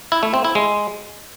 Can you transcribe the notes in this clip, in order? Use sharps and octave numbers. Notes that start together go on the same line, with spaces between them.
E4
A3
C4
E4
G#3